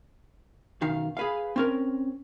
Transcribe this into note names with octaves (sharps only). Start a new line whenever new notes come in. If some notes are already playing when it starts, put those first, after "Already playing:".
B1 F#2 D#3 F5
G#4 B4 F5
C4 C#4 A#4